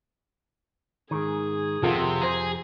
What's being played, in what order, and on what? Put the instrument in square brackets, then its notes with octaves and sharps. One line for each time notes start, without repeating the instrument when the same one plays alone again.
[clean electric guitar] G#2 D#3 [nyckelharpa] G#4
[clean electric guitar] F2 G4 F#5 [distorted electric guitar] C3 [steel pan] F4 A4 A#4
[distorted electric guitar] G#4 [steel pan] C5 A#5